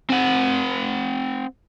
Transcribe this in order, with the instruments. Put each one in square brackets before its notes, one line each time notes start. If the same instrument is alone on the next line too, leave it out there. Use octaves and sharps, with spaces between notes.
[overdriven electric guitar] C4 F#5